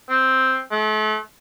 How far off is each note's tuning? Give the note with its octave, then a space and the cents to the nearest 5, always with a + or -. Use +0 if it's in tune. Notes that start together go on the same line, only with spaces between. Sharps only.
C4 +0
A3 -40